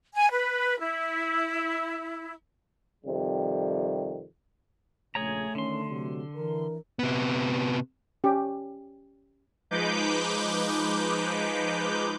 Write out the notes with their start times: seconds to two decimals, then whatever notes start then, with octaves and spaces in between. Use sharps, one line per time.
0.15 G#5
0.31 B4
0.80 E4
3.05 F2 C3 D#3 G3
5.15 A#1 C#3 A3 G#4 C#5 A#5
5.55 D3 D#3 C#4 C6
5.89 C3 F#3
6.36 E3 D4 A#4
6.99 C3 B3
8.24 C#4 G4
9.71 F3 G#3 D#4 B4 D6 G6